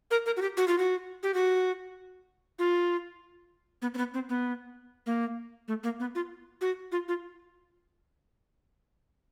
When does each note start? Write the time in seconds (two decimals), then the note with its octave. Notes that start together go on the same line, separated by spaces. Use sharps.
0.11 A#4
0.26 A#4
0.37 F#4
0.42 G4
0.57 F#4
0.68 F4
0.78 F#4
1.23 G4
1.34 F#4
2.59 F4
3.82 B3
3.94 C4
3.98 B3
4.14 C4
4.29 B3
5.06 A#3
5.68 A3
5.84 A#3
6.00 B3
6.15 F4
6.61 F#4
6.92 F4
7.08 F4